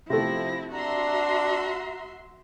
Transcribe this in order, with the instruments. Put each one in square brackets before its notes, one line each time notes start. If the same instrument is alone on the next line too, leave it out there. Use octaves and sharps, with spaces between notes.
[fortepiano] C3 A3 [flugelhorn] F3 [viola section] E4 [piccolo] A#6
[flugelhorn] D4 [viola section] F#4 E5 C6 [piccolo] A#5